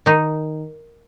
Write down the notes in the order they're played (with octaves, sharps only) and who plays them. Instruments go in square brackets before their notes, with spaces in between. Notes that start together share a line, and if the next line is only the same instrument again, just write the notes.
[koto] D#3 D#4